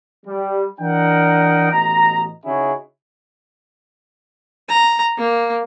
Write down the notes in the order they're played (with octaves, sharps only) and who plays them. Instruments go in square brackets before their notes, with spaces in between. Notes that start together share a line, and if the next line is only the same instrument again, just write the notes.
[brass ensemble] G3
E3 D4 A#4 D#5 F#5 G5
A1 B2 D#5 A#5
C#3 C#4 D#4 E4 F#4 G#4
[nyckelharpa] A#5
A#3